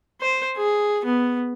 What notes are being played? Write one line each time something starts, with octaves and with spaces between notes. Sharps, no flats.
C5
G#4
B3